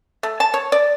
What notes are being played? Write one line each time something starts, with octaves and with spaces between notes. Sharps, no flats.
A3
A5
C#5
D5